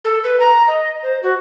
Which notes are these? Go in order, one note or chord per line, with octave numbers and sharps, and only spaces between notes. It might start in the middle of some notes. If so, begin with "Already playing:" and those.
A4
B4
A#5
D#5
C5
F#4